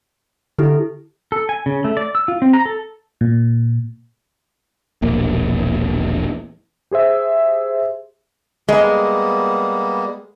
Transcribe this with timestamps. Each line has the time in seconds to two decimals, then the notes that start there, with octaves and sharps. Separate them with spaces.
0.59 D3 E4 G4 A4
1.32 A4
1.49 G#5
1.66 C#3
1.84 A3
1.97 D5
2.15 E6
2.28 F4
2.42 C4
2.53 A#5
2.65 A4
3.21 A#2
5.02 E1 A#1 E2 A#3
6.91 G4 G#4 C5 E5
8.69 G3 G#3 A#3 B3